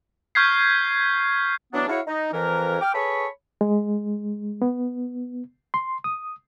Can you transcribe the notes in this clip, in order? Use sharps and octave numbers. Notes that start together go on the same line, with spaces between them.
C#6 F6 G6 G#6 B6 C7
E3 F#3 B3 D4
E4 F#4 G#4 C#5 F5 F#5
D#4
F2 E3 A#4
G5 D6 F6
G#4 A4 B4 C#5 B5 C#6
G#3
B3
C6
D#6